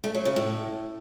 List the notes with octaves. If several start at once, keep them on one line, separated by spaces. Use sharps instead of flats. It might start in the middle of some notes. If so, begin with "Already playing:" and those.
A3
F#3
C#3
A2